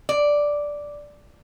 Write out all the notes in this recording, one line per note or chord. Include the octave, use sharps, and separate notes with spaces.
D5